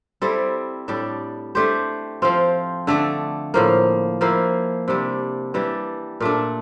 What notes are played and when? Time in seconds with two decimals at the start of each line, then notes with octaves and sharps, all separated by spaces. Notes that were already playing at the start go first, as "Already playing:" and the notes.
0.22 G3 C4 E4 A4
0.88 A2 G3 D4
1.55 A3 D4 G4 C5
2.22 F3 C4 F4
2.87 D3 A3 D4
3.54 A2 F3 A#3
4.21 F3 A#3 E4
4.88 C3 G3 D4
5.54 E3 G3 D4
6.21 A#2 A3 D4